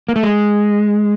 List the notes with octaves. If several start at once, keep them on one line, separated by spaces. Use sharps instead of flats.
A#3
A3
G#3